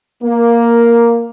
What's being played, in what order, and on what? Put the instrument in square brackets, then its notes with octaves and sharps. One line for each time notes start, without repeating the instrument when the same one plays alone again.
[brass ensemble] A#3